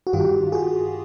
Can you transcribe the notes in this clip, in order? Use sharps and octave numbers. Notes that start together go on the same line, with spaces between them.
F#4
G2 D#3 F4 G4
F#4 G#4